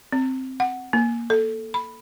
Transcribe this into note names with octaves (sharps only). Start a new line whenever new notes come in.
C4
F#5
A#3
A4
B5